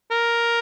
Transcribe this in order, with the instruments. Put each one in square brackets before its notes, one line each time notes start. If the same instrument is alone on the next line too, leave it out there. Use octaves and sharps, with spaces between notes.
[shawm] A#4